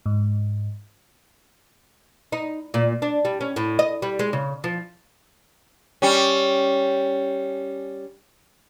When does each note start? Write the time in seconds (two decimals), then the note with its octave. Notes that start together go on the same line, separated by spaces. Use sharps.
0.06 G#2
2.32 D#4
2.74 A#2
3.02 D4
3.25 G3
3.41 C#4
3.56 A2
3.79 D#5
4.02 G3
4.19 G#3
4.33 C#3
4.64 F3
6.02 G3 C#4